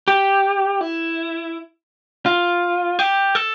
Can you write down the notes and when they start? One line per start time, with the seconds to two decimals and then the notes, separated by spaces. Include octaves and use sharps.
0.08 G4
0.81 E4
2.26 F4
2.99 G4
3.35 A4